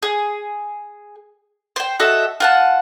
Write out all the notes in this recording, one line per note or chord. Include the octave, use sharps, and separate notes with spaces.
G#4
C5 G5
F#4 A4 D#5 E5
F4 F#5 A5